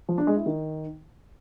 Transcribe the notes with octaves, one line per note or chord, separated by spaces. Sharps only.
F3
D4
G#3
E4
D#3